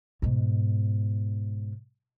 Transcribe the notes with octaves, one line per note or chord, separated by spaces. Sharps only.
G#2 B2